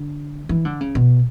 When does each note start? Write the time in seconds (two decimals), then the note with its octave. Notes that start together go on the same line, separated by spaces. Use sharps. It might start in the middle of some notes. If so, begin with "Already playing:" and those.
Already playing: D3
0.49 E3
0.65 D3
0.81 C#3
0.95 B2